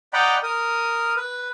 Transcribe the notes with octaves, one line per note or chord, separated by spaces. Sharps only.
D5 D#5 F#5 G5 A#5 B5
A#4 D#6
B4